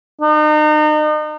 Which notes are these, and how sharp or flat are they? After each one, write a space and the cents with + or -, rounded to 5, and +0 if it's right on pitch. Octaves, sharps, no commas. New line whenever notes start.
D#4 -35